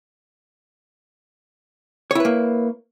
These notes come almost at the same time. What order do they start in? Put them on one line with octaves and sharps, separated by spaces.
C#5 E4 B4 A#3